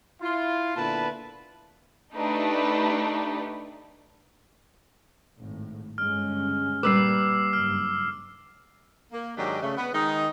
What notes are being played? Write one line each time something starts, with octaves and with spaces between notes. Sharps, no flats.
E4 F4
A#2 D3 B3 E4 B4 A5
A3 D4 D#4 G4 B4
G#1 A2
G1 G#3 C#4 F6
A#2 G3 A#3 B4 D6 E6 C7
F#1 G2 F6
A#3
G#2 D#3 F#3 D4 G4
C#3 A3
B3
D#3 G#3 D#4